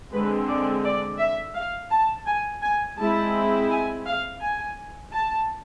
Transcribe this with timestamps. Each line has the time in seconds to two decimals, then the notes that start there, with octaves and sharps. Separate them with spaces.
0.12 D3 G#3 C4 B4
0.48 D5
0.84 D5
1.19 E5
1.55 F5
1.91 A5
2.26 G#5
2.63 G#5
2.98 G#3 C4 E4 A5
3.70 G#5
4.06 F5
4.41 G#5
5.13 A5